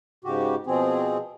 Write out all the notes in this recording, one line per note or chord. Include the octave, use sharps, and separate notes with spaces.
G#2 C#3 F#4 G4
B2 F3 C4 G#4